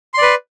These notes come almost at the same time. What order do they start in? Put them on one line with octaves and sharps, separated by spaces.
C6 D5 B4